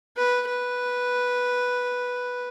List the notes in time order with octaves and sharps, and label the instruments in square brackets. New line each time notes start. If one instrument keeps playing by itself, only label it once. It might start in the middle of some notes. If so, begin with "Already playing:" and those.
[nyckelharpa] B4
B4